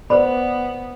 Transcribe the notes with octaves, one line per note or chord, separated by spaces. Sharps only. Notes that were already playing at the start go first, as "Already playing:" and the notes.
B3 B4 C5 D5 B5